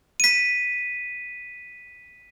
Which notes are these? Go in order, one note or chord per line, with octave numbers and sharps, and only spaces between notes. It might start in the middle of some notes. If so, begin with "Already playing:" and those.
B6 D#7